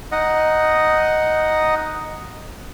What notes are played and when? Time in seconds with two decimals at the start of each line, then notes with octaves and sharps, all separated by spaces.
0.12 D#4 D#5 F#5